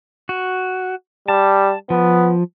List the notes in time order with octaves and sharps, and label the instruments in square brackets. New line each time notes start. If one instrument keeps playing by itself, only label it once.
[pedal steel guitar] F#4
[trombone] G3 [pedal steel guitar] A5
[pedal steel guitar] F3 [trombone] B3